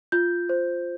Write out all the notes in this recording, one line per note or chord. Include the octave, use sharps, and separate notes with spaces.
F4 G6
C5